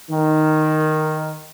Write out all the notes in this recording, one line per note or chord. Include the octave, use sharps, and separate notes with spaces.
D#3